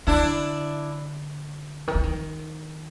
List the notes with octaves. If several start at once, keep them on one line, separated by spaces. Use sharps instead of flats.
D3 D4 E4
D#3
E3
D#3